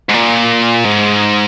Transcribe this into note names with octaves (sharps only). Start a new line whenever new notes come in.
G#2
A#2
G#2